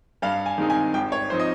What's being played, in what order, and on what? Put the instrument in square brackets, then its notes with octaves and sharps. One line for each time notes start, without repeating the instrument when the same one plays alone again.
[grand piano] G2 F5
G#5
D#3 G#3 C4 D#4
G#5
G#1 G5
C#5
F3 C4 D#4 C5
D#5